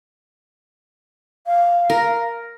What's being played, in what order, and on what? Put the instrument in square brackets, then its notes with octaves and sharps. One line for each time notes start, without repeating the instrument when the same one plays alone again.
[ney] F5
[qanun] A#4